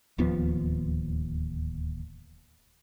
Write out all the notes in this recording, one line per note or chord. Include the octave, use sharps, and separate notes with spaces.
D1 D#2 F3 B3